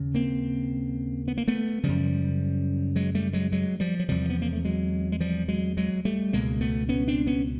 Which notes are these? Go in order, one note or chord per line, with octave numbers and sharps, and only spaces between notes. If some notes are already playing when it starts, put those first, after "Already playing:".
Already playing: D#2 C#3
A#3 C4
B3
A#3
A3 B3
F#2 C#3 F3 G3
F#3 G#3
G3 A3
F#3 G#3
F#3 G#3
F3 G3
F#3
E2 C3 F3 G3
B3
A#3
A3
F#3 G#3
G#3
F3 G3
F#3 G#3
F#3 G#3
G3 A3
C#2 B2 G#3 A#3
A3 B3
B3 C#4
C4 D4
B3 C#4